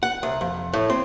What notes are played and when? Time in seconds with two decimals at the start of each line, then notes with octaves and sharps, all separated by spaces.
0.03 F#5
0.23 C2
0.41 F2
0.74 A2
0.90 C4